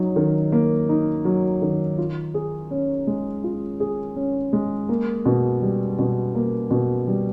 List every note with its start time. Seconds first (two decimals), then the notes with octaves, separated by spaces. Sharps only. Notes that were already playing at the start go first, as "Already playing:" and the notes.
Already playing: F#3 D#4
0.16 D#3
0.52 A#3
0.89 D#4
1.25 F#3
1.62 D#3
1.98 F4
2.34 G#4
2.71 C#4
3.07 G#3
3.44 F4
3.80 G#4
4.16 C#4
4.53 G#3
4.89 A#3
5.26 B2
5.62 G3
5.99 B2
6.35 A#3
6.71 B2
7.07 G3